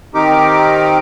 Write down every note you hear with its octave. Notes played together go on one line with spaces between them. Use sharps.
D#3 C4 D#4 G4 A#4 D6